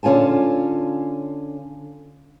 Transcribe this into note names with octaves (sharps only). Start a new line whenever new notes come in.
D3 C#4 F4 G#5 A5